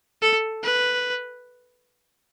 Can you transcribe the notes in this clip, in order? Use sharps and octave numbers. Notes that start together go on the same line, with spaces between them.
A4
B4